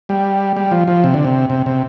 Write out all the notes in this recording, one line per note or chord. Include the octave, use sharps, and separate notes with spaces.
G3
G3
F3
F3
C3
D3
C3
C3
C3